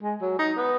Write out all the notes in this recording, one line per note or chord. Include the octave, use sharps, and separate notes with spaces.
G#3
F#3
D#4
B3